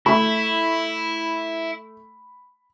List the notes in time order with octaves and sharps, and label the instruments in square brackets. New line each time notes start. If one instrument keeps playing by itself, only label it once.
[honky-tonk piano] A3 [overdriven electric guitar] E4 [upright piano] B5